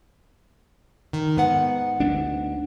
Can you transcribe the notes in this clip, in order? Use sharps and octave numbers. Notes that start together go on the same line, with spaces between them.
D#3
G#2 B3 F#5
D2 A3 D4